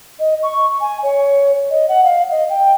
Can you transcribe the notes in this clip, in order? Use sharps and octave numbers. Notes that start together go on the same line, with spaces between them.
D#5
C#6
G#5
C#5
D#5
F#5
F5
D#5
G5